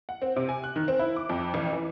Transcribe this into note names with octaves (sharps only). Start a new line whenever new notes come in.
F#5
C4
C3
G#5
F#6
D#3
C4
E4
D6
F2
A1
E3